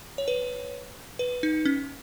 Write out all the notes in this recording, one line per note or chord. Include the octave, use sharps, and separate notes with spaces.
C#5
B4
B4
D#4
C#4